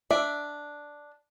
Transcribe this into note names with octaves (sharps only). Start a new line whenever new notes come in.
D4 D5 E5